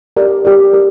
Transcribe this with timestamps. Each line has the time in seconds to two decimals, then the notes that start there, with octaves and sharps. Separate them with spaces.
0.17 G4 A#4 D5
0.45 G4 A#4 D5
0.73 G4 A#4 D5